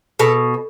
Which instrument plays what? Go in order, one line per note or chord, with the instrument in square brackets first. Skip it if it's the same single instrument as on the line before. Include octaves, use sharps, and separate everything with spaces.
[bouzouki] B2 A4